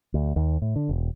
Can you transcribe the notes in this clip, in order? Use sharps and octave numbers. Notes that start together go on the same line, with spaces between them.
D2
D#2
A2
D3
E1